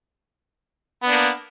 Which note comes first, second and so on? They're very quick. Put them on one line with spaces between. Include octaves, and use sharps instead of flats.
B3 D4 A#3